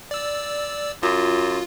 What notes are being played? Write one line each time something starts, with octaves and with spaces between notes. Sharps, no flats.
D5 E6
F#2 F4